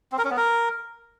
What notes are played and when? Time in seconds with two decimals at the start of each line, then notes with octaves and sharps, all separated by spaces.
0.12 C4
0.18 A#4
0.25 C#4
0.31 B3
0.37 A#4